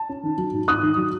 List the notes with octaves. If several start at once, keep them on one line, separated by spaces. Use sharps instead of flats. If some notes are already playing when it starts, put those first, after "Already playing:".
Already playing: A5
C#4
D#3
F#3
G#2
G#2 D#6 F#6
D#3
F#3